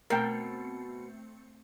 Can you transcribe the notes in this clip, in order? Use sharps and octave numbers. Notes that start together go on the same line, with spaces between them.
B2 A3 C4 A#4 G5 C#7